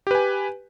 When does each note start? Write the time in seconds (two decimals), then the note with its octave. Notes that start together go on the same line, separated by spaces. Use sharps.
0.07 G4
0.11 B4
0.15 G#5